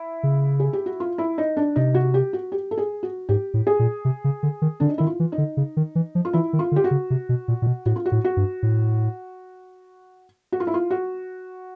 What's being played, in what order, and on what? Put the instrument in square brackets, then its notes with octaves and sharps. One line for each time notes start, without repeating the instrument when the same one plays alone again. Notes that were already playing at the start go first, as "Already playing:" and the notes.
Already playing: [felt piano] E4
[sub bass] C#3
[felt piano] G#4
G4
F#4
F4
E4
D#4
D4
[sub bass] C3 [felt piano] D#4
[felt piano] F#4
G4
F#4
G4
A4
G#4
F#4
[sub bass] G#2 [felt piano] G4
[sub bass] A2
[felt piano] G#4
[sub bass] A#2
C3
C#3
D3
D#3
[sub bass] D3 [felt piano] D4
[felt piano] D#4
[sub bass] D#3 [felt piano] E4
[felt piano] F4
[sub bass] E3
[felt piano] D#4
[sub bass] D3
C#3
D#3
E3
F3
[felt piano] F4
[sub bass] E3 [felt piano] E4
[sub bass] D#3
[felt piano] F4
[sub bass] D3
[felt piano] G4
F#4
[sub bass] C#3
C3
B2
A#2
A#2
B2
[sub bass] A2 [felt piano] F#4
[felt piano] F4
F#4
[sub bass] A2
[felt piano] F#4
[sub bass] G2
A2
[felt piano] F#4
F4
E4
F4
F#4